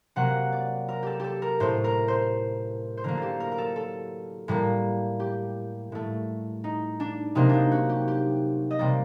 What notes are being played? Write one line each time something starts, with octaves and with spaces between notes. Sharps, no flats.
C3 F#3 A#3 F#5
D5
A#4
G4 A4
G4 A4
A#4
A2 A3 C5
A#4
C5
C5
D3 F#3 A#3 A#4
G4 A4
A#4
A#4
A4
A4
A2 G3 A#3
G4
A2 A3
D#4
D4
C3 F#3 A#3 D#4
D4 D#4
F#4
G4
G4
D#5
C3 G3 A#3 D5